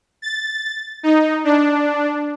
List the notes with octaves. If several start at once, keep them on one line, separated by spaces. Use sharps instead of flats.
A6
D#4
D4